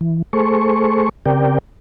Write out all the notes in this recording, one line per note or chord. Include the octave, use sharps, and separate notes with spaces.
E3
A3 G#4 A4 C5 C#6
C#3 C4 G4 A#4 D5 G5